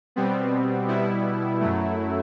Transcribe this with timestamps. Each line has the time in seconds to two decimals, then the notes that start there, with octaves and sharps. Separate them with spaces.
0.16 B2 G3 B3 C4
0.88 B2 G3 B3 E4
1.60 F#2 F#3 A3